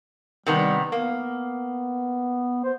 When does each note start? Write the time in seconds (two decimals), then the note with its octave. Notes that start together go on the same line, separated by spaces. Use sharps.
0.46 C3 D#3 G3 B3
0.92 A#3 B3
2.64 C5